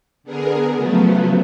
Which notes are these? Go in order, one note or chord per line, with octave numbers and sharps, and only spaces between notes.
D3 B3 G#4 A#4
C#3 F3 F#3 A3 B3